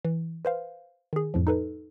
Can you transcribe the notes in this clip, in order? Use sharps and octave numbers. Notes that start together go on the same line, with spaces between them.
E3
B4 C5 F5
D#3 G#4
F2 A2 F3
D#4 A4 B4